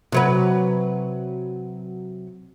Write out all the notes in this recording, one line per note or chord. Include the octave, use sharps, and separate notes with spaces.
C3 F#3 B4